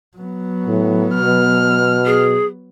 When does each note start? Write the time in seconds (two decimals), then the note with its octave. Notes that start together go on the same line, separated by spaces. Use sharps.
0.17 F#3 B3
0.66 A2
1.15 B2 F6
2.06 G#4